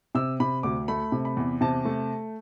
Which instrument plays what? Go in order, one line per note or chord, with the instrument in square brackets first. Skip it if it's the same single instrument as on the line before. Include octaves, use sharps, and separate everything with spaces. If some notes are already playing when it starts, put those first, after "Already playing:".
[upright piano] C3 E6
C3 B5
D2 D6
A3 B5
C3
B5
E2
C3 A5
A3